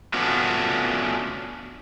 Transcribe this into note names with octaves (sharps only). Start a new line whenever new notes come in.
A3 B3 C#4 D4 F4 F#4